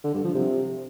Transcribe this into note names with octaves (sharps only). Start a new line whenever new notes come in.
D3
G2
F3
C3